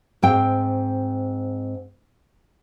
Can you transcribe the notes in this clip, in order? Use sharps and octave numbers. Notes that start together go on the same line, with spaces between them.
G#2 C4 G5